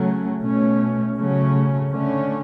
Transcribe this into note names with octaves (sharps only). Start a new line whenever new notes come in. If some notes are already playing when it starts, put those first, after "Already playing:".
Already playing: C#3 F#3 A3 C#4
B2 A3 C#4
C#3 F#3 A3 C#4
D3 A3 C#4